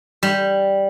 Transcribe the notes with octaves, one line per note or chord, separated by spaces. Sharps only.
G3